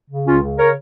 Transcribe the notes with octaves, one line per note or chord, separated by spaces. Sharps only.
C#3
C#2 C#4 F4
C#3
A#4 C#5